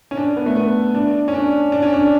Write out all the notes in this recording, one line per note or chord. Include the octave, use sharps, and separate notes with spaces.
C#4
D4
B3
A3
B3
D4
C#4
D4
D4
C#4
D4